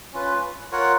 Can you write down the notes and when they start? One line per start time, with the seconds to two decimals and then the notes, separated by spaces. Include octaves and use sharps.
0.13 C#4 F4 B4
0.72 F4 A#4 C#5 F#5